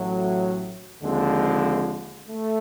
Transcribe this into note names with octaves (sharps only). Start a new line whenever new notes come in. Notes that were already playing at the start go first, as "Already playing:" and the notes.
Already playing: A1 A2 F#3 A3
D#2 D3 F3 G#3 C4
A3